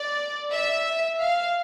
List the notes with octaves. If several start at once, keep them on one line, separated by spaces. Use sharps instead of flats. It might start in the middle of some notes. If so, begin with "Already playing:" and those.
Already playing: D5
E5
F5